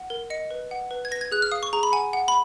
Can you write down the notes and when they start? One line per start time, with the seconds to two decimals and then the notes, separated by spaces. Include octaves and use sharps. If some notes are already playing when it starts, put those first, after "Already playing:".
Already playing: F#5
0.10 A#4
0.30 D#5 C#7
0.51 B4
0.71 F#5
0.91 B4
1.05 G#6
1.11 B4 A#6
1.21 G#6
1.32 G#4 F#6
1.42 F6
1.51 F5 D#6
1.63 C#6
1.73 G#4 A#5
1.83 B5
1.92 F#5 G#5
2.13 F#5
2.28 B5